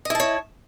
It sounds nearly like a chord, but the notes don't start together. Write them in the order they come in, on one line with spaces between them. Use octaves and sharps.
D#5 E4 A5 C#5